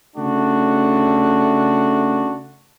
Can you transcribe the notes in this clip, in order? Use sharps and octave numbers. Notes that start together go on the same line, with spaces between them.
C#3 A3 D4 F#4